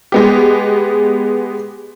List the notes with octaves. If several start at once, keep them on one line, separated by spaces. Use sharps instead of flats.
G#3 B3 G4